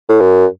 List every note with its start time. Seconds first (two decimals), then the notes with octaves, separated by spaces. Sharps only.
0.09 A2
0.20 F#2